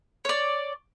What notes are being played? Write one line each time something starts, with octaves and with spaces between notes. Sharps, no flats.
C#5 D5